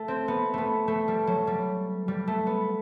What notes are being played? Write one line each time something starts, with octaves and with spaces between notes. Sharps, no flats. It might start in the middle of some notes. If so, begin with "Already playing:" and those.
Already playing: A3
C4
B3
A3 B3
A3
G3
F#3
G3
G3
A3
B3